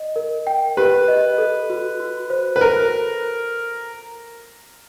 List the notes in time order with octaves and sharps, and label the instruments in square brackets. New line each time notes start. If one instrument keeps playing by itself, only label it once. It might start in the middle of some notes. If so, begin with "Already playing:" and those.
Already playing: [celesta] D#5
A#4
G5
[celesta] G4 [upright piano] B4
[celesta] D#5
A4
F#4
F#4
C5
[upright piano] B4
[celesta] A4 [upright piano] A#4